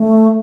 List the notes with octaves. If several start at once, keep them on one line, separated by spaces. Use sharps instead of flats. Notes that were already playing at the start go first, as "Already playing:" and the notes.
Already playing: A3